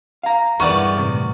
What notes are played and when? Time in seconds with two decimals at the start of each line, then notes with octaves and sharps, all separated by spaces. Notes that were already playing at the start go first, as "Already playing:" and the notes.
0.23 F5 A#5
0.60 G2 D#3 E3 G#3 B3 D5 C#6 D#7
0.98 A2 C3